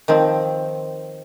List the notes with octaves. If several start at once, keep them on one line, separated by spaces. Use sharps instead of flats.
D#3 F3 C4